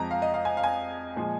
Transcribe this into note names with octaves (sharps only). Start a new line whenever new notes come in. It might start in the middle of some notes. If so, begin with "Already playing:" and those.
Already playing: F2 F3 G#3 A#5
F5
D#5
F5
G#5
F5
G#5
A#2 F3 G#3